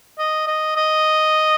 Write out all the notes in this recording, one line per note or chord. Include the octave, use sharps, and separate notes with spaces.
D#5
D#5
D#5